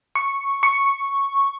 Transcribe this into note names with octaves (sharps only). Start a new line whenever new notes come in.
C#6
C#6